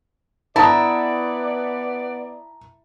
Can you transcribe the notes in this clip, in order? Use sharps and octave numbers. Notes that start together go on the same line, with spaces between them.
B3 E4 D5 A5 A#5 D#6